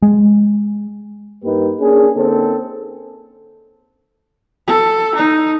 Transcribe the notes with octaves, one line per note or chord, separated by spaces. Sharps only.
G#3
G2 A#3 D#4 G4 B4
A#3 C#4 D4 G#4
D3 A#3 C4 C#4 D#4 A4
A4
D#4